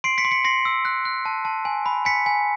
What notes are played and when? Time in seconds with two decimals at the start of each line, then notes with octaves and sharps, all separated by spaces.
0.04 C6 C7 D7
0.18 B6 C#7
0.25 C6
0.31 B6 C#7
0.44 C6 A#6 C7
0.65 E6
0.85 F#6
1.05 F#6
1.25 A5
1.45 A5
1.65 G#5
1.86 B5
2.05 G#5 B6 C#7
2.26 G#5